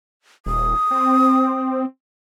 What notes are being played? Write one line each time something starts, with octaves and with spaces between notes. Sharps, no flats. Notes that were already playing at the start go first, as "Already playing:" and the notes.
D#1 D#6
C4